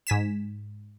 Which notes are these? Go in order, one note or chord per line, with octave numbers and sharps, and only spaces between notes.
G#2 G#5 B6 E7